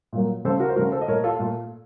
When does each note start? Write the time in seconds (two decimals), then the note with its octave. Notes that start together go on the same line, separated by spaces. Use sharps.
0.13 A#2 F#3 A#3
0.45 C#3 A3 A4 C5
0.60 F#4 A#4
0.69 C5
0.76 A3 F#4 A#4
0.79 C#3
0.92 A4 C5
1.01 D#5
1.08 A#2 A3 A#4 C#5
1.24 F4 A4
1.39 A#2 A3